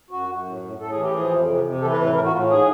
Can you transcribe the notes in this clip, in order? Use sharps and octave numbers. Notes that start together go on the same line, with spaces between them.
F#2 F#4
F#2
A2
A2
A2 A4
G#4
E3
G4
F3 G#4
F2
C3
C3
E3 A4
B4
A2
B4
A2 A#4
F#4
A2 F4
G#2 G#4